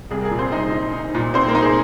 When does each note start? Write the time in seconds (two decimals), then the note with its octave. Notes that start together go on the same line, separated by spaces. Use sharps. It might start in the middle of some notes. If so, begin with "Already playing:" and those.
0.11 C2 G#4
0.21 A#4
0.25 G#4
0.31 A#2
0.39 C4 C5
0.52 C2 D#4 D#5
0.72 D#4
0.93 D#4
1.15 A#2
1.34 C4 D#4 C5
1.48 A#3 A#4
1.55 D#4
1.62 G#4